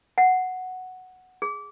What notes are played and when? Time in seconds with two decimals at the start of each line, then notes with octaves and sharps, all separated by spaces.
0.18 F#5
1.42 G#4